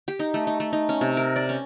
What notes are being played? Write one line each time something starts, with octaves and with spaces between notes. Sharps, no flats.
G4
D#4
A3
D#4
A3
D#4
C#4
C3
A#4
D5
C#4